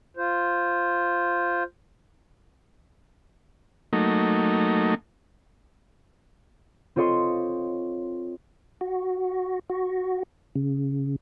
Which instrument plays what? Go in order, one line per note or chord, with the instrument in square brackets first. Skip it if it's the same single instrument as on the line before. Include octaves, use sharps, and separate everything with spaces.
[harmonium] F4 C5
[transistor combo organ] F#3 A3 A#3 D#4
[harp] C4 F4 A4 C#5 D#5 C6
[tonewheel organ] F#4
F#4
C#3